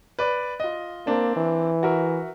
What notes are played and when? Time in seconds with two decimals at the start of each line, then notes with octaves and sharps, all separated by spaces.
0.19 B4 D5
0.60 F4 D#5
1.07 A#3 C4 D4
1.36 E3
1.83 F#4 A#4 E5